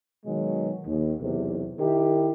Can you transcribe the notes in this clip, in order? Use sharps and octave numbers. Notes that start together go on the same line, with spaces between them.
B2 D#3 F#3 G#3
D#2
B1 E2 C3
D#3 E4 G4